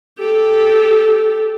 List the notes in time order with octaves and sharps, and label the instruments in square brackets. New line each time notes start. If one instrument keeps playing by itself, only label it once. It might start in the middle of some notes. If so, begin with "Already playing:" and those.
[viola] G4 A4